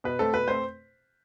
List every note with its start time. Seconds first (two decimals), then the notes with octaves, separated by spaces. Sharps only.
0.04 B2 B4
0.19 A3 C4 A4
0.33 B2 B4
0.47 A3 C4 C5